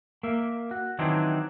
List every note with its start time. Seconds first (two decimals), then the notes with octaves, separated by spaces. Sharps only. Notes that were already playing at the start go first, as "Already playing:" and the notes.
0.23 A#3 E5
0.71 F#4
0.99 D#3 E3 F#3 C4 D4 D#4